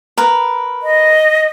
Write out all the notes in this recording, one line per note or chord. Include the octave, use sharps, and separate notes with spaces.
A#4 B4
D#5